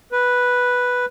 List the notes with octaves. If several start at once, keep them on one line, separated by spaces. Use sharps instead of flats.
B4